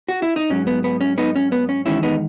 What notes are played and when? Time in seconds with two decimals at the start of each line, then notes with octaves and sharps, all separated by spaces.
0.08 F#4
0.22 E4
0.36 D#4
0.50 G#2 F#3 C#4
0.67 B3
0.84 B3
1.01 C#4
1.18 B3 D#4
1.36 C#4
1.52 B3
1.69 C#4
1.86 E2 D#3 G#3 C#4 E4
2.03 B3 D#4